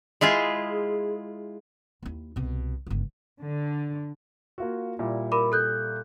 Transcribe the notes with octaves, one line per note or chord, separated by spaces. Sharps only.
G#3 E4 F4 G#4
D#2 E4
C2 B2
G1 C#2
D3
A#3 F4 F#4
A#2 G3 E4
A#4 B5 D6
A4 F#6 G6